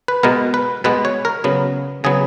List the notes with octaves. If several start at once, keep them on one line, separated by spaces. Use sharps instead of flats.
B4
B2 G#3 B3 A#4
B4
B2 G#3 B3 B4
C#5
A#4
C#3 F#3 B3
C#3 F#3 B3 G#4